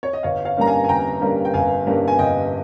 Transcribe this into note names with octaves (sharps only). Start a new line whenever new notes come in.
C#5
D#5
G1 C#5 F5
C#5 F5
G2 G3 A#3 C#4 A#5
F5 G#5
G#5
G1 G5 A#5
G2 G3 A#3 C#4
G5
G1 F5 G#5
G2 G3 A#3 C#4
G#5
G1 D#5 G5